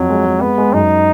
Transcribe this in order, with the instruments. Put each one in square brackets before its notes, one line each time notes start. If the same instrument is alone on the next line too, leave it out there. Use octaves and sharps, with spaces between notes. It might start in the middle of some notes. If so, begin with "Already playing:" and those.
Already playing: [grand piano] F2 [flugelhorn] F#3
[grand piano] G#3
G#3
[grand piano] G#3 [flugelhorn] B3
[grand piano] G#3
[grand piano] F#2 [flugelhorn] D#4